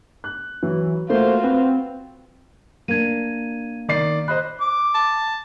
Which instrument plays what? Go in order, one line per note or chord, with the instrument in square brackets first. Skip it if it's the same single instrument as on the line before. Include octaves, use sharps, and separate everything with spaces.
[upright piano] F#6
[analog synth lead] E3 [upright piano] F#3
[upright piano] A3 A#3 [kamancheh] F4 F#4 [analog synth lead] C5
[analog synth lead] C4 [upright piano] B4
[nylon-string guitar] A#3 D4 [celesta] G#6 D#7
[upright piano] D#3 D5 C7
[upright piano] C5 D#5 B5 [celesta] F#6
[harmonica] D6
[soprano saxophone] A5